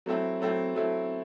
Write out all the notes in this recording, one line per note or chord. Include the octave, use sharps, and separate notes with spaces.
F#3 A3 C4 E4
F#3 A3 C4 E4
F#3 A3 C4 E4